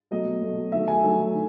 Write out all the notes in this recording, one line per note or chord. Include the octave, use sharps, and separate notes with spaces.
B2 F#3 A3 D#5
B2 F#3 A3
D#3 F#3 A3 E5
G#5
D#3 F#3 A3
D#3